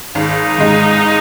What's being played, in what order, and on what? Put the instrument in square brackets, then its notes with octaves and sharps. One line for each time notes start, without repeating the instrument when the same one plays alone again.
[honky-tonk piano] G#1 [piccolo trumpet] D#4
[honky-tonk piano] G#2 G#3